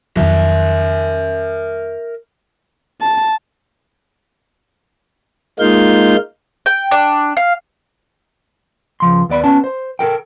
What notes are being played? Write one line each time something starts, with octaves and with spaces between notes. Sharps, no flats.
F2 D#3 F#3 A#4 E5
A5
G#3 A#3 D#4 F4 F5 G6
G5
D4
F5
C#2 F3 C6
D#2 B3 D5 B5
B3 C#4 A5
C5
A4 A#4 G5